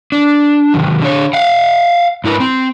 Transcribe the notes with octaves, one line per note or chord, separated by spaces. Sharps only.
D4
C3 D#3 F#3
D3 C#5
F5 F#5
G#2 E4 A#4 B4
C4